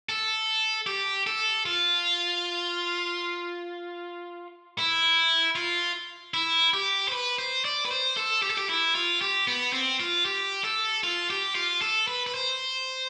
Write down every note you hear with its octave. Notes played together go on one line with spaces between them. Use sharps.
A4
G4
A4
F4
E4
F4
E4
G4
C5
B4
C5
D5
B4
C5
A4
G4
A4
G4
E4
F4
G4
B3
C4
F4
G4
A4
F4
G4
F4
A4
B4
B4
C5